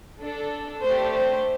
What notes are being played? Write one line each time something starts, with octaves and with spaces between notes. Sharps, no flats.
D4 A4
A3 D4 G4 C5
C5